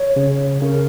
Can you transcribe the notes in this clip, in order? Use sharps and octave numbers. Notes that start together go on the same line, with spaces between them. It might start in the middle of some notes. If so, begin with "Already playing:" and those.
Already playing: C#5
C#3
C#3 A#4